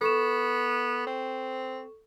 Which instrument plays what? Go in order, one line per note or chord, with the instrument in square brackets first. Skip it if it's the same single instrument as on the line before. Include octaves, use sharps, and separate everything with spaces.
[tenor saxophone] B3 [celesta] A4 C#6 E7
[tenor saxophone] C4